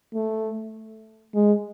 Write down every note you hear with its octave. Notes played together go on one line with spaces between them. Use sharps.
A3
G#3